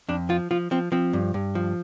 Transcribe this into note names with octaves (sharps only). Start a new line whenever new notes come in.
F2 D4
F3 F4
F3 F4
F3 C4
F3 C4
G2
G2
F3